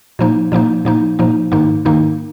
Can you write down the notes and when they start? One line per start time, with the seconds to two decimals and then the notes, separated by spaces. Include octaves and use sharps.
0.19 A#2 F3 A#3 D#4
0.52 A#2 F3 A#3 D#4
0.85 A#2 F3 A#3 D#4
1.19 A#2 F3 A#3 D#4
1.52 G#2 D#3 A#3 D#4
1.85 G#2 D#3 A#3 D#4